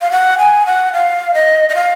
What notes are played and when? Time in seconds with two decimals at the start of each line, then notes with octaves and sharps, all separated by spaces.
0.01 F5
0.11 F#5
0.38 G#5
0.66 F#5
0.93 F5
1.34 D#5
1.69 D#5
1.75 F5